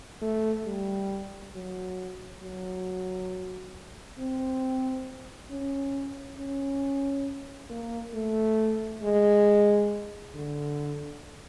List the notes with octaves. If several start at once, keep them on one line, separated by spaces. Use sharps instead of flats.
A3
G3
F#3
F#3
C4
C#4
C#4
A#3
A3
G#3
D3